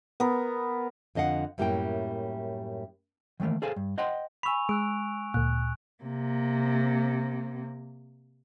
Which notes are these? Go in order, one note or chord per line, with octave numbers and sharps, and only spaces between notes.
B3 A#4
F2 D3 D#5 F5 F#5
F#2 A2 G3 A#3 E4 G5
D#3 E3 F#3 A3 A#3
G#4 A4 C5 F5 G#5
G2
C5 D#5 F#5 G5 C6
G#5 B5 C#6 E6 F7
G#3 E6 F#6 D7
D2 A#2 F#6
C3 A#3